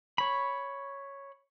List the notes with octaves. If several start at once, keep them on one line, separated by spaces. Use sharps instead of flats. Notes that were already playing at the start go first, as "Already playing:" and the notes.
C#5 B5